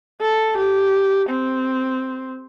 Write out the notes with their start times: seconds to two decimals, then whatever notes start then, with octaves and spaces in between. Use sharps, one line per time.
0.21 A4
0.58 G4
1.29 C4